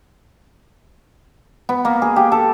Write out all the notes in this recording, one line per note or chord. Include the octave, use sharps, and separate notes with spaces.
B3
A#3
G#4
G4
A4